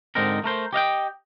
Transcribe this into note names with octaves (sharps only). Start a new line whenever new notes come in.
G#2 D3 C4 D#4 A#4
A3 A#4 C5
G4 D#5 F5 G5